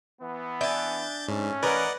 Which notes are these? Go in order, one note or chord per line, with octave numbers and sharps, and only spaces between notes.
E3 B3
D4 E5 G#5 G6 A6
G#2 A3 C#4
E3 A#4 B4 D5 D#5 F#5